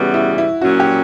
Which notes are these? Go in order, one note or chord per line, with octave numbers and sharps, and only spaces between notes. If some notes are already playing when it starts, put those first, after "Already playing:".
Already playing: C#3 E3 G3 B3 F#4
E4
E4
A#2 F#3 C#4 F#4
G4